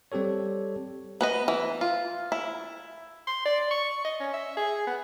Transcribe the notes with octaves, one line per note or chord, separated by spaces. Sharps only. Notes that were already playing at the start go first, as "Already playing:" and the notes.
G3 C4 G4 A4 C#5
B3 B4 D#5
E3
F4
E4
C6
D5
C#6
D#5
C#4
E5
G#4
B3